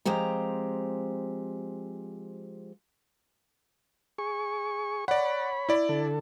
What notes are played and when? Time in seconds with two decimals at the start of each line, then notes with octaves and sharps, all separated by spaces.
0.05 F3 G#3 C4 G4 A#5
4.18 G#4 C#6
5.08 C#5 D5 F#5 B5
5.69 E4 D5
5.89 D3 A4